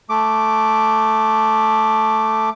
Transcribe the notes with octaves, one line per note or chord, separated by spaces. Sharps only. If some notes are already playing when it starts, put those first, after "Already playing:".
A3 D6